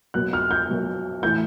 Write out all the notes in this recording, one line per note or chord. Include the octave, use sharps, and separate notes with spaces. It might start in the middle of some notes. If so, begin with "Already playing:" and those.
B2 F#3 A#3 F#6
F6
G6
B2 F#3 A#3
A2 E3 A3 G6